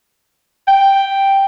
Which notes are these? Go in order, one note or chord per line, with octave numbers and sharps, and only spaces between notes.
G5